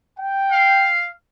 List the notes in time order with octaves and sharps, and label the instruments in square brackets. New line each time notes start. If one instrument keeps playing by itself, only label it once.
[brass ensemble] G5
[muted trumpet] F5